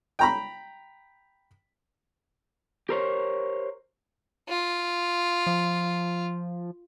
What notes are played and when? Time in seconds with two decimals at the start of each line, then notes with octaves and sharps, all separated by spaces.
0.19 G5 A#5 B5
2.89 G4 A#4 C5 C#5
4.49 F4
5.47 F3